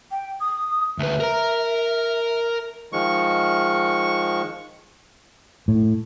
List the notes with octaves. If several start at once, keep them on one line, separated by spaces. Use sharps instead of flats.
G5
D#6
D2 B4 E5
A#4 A#5
D#3 F3 G#3 C#6
A2